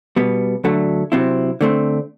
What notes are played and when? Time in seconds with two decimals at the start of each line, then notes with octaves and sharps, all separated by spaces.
0.16 B2 G3 B3
0.64 D2 D3 F#3 A3
1.12 C3 F#3 C4 E4
1.61 D3 A3 C4